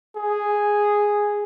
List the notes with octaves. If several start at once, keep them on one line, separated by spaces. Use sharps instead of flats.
G#4